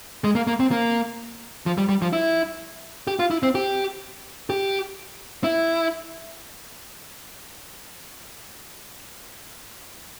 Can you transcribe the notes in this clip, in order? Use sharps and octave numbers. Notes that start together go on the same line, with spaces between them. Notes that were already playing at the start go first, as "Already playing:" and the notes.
G#3
A#3
A#3
C4
A#3
F3
G3
G3
F3
E4
G4
F4
E4
C4
G4
G4
E4